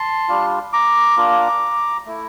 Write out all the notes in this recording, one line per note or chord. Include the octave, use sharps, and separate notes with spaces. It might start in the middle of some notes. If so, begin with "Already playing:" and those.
Already playing: A5 C6
G3 D4 F4
A#5 D6
A#3 D4 F4
A3 E4